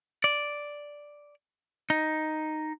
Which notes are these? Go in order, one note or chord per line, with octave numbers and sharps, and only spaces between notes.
D5
D#4